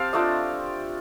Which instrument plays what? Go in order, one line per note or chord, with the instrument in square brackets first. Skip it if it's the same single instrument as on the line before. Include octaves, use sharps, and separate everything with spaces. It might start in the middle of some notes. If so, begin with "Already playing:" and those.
Already playing: [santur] C4 G4 A4 C5 F5 G5
A3 D4 F4 D#5